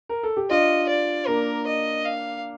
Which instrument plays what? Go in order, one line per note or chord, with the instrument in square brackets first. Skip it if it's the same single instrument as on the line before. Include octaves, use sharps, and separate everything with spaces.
[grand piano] A#4
A4
G4
[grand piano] D4 F4 [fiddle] D#5
[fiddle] D5
[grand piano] A#3 D4 [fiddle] A#4
[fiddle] D#5
F5